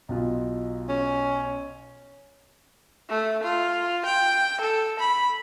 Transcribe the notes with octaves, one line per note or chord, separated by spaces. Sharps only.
B1 B2 F4
C#4
A3
F4
G5
A4
B5